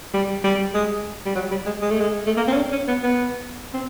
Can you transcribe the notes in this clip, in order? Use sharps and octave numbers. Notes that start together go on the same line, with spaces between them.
G3
G3
G#3
G3
F#3
G3
G#3
G#3
A3
G#3
A3
A#3
C4
C#4
D4
C#4
B3
B3
C4